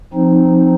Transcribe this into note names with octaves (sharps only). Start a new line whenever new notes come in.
F3 C4 D#4